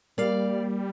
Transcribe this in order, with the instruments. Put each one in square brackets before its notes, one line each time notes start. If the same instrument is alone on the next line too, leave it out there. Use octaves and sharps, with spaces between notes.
[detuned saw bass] G3 [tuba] A#3 [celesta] A#4 [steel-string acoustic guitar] D5 F5